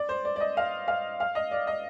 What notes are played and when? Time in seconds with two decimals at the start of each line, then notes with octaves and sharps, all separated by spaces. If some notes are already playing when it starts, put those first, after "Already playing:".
Already playing: D5
0.09 C5
0.25 D5
0.36 D5
0.40 D#5
0.57 F5
0.88 F5
1.20 F5
1.35 D#5
1.51 D5
1.67 D#5